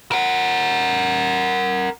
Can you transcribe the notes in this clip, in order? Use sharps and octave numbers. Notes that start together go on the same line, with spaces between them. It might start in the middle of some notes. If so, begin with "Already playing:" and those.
A#4 F#5